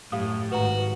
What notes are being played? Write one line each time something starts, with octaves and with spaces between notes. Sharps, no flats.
F#2 A2 G4 F5 D#6
G#1 F#4 B4 A#5